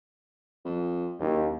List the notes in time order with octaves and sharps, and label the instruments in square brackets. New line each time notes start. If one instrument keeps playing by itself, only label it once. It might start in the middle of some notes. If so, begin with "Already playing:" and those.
[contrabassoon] F2
[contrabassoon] F#1 [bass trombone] D#2